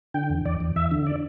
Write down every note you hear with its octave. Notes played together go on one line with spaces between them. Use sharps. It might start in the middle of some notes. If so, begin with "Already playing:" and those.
D3 G5
E2
E2 D5
E2
E2 E5
D3
D5